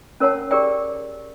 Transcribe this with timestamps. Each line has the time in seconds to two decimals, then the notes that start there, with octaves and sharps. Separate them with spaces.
0.20 C#4 A#4 C#5 F#5 A5
0.51 G4 G#4 A#4 D5 G5